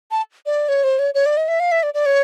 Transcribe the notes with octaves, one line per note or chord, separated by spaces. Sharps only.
A5
D5
C#5
C5
C#5
C#5
D5
D#5
E5
F5
E5
D5
D5
C#5